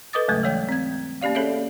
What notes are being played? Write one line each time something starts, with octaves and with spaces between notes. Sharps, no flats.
A4 B4 D#5 D6 D#6 A6
D#2 G#2 C#3 F#3 G#3 A3
E3 G3 C#5 G5 G6
C4 G#6
A#3 C#4 G4 D5 F5
C#4 G#4 A4 C#5 D5 E5